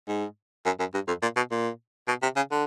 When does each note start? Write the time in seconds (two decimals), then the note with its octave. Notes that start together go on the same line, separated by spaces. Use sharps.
0.08 G#2
0.65 F#2
0.79 F#2
0.94 G2
1.08 F2
1.22 A#2
1.36 B2
1.51 A#2
2.08 B2
2.23 C3
2.36 C#3
2.51 D3